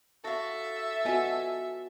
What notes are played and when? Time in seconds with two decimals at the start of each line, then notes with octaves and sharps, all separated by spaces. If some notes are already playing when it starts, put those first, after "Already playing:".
0.24 F#4 A4 E5 F5
1.05 B3 F4 F#4 D#5 G#5